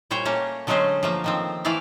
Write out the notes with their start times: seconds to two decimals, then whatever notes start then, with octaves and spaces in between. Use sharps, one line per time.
0.11 A#2 G3 C5 C#5 G5
0.25 A3 A#3 C#4
0.67 D3 F#3 G#3 A3 C#4 C5
1.03 F3 A3 A#3
1.24 D#3 F3 C4
1.65 E3 A3 E4 D5 F5